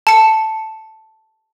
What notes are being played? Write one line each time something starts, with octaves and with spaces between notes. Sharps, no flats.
A5 C#7